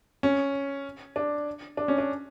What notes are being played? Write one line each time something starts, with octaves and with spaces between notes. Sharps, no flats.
C#4
D4
D4
C#4
D4